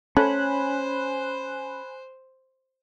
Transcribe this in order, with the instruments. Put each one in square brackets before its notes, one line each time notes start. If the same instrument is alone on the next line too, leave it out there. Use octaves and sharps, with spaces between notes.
[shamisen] A3 [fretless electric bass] C#4 [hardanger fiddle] C5 [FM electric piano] G#5 B5 F#6